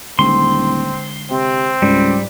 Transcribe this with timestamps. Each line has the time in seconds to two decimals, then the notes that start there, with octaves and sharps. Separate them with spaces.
0.19 D#1 D3 G#3 C4 C6
1.31 C3 C4
1.82 C#2 G#2 G3